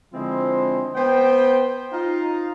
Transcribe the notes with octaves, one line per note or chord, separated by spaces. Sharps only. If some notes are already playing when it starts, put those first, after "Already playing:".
D3 F3 G#3 C4 E4 C5
B3 C5 G5
D#4 F4 F5